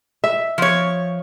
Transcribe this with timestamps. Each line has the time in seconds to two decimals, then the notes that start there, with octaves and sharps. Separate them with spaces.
0.24 E5
0.58 F3 C#5